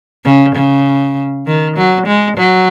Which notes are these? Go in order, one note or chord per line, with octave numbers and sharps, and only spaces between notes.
C#3
C#3
D#3
F#3
G#3
F#3